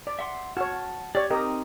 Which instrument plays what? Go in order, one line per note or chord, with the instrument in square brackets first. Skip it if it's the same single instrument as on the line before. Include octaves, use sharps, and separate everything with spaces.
[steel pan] D5
[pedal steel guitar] E5 F#5 C6
[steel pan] F#4 C#5 [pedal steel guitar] F#5 A5 F6
[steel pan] G4 C#5 [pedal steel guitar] D5
[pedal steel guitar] C4 D#4 [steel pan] G4 A#4 D#5